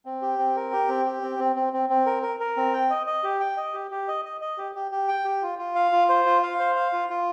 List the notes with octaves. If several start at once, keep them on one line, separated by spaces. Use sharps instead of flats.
C4
G4
C4
A#4
G4
C4
G4
C4
C4
C4
C4
C4
A#4
A#4
A#4
C4
G5
D#5
D#5
G4
G5
D#5
G4
G4
D#5
D#5
D#5
G4
G4
G4
G5
G4
F4
F4
F5
F4
C5
F4
F5
C5
F5
F4
F4